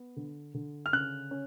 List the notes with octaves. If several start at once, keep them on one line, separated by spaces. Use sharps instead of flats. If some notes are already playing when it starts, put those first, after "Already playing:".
Already playing: B3
D3
D3
F6
C#3 F#6
C#4